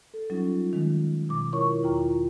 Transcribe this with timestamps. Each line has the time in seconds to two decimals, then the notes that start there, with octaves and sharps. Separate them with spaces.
0.14 A4
0.30 F#3 G3 C#4 D#4 F4
0.73 D#3 G#3
1.29 B2 D6
1.52 E4 F4 A#4 C#5 C#6
1.83 E2 E4 F4 G5 A#5